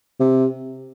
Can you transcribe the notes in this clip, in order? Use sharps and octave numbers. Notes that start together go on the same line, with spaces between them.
C3